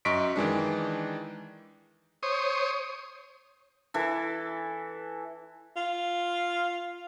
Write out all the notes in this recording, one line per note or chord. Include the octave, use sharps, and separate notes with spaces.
F#2 D#5 C#6 B6 D7
D#3 E3 G#3 D4
C5 C#5 D#6
E3 A4
F4